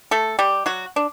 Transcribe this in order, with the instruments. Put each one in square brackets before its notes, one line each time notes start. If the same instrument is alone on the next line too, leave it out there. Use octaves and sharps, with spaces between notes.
[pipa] A3 A4
G3 G4
F#3 F#4
D4